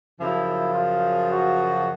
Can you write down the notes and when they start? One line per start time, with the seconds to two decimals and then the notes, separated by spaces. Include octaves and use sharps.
0.19 F#2 C#3 F3 E4
0.74 F4
1.29 F#4